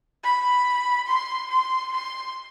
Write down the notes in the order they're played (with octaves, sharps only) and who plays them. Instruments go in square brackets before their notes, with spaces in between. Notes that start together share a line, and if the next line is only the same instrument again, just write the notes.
[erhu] B5
C6
C6
C6